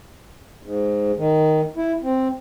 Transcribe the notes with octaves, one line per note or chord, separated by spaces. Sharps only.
G#2
D#3
E4
C4